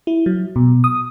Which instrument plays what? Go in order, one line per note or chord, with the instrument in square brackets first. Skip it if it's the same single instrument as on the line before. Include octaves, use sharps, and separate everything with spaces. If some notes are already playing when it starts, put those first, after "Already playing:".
[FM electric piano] E4
F#3
B2
D#6